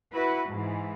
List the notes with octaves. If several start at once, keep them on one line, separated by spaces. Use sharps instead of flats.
E4 F#4 B4
G#2 E3